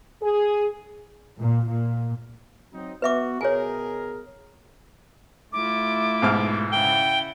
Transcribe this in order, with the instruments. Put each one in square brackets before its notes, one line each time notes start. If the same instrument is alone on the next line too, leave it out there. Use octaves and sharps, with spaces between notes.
[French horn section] G#4
[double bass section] A#2
A#2
[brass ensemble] F#3 C4 D#4
[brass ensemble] B3 F#4 [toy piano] B4 E5 D6
[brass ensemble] B2 G#4 A#4 [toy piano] C#5 G#5
[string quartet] A3 E4 F4 [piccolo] D6
[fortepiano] B1 G#2 F6
[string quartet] C#3 E4 F#5 [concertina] G5 [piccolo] G7